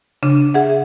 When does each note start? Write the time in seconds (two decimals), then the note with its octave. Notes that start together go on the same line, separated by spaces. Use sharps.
0.23 C#3 D4
0.54 G#4 E5 F#5